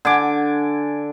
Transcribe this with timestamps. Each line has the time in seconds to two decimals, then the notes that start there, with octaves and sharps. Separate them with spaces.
0.05 D3 G#5 D6